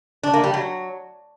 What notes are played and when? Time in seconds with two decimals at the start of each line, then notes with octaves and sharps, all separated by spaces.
0.23 D4
0.34 A#3
0.44 G3
0.54 F#3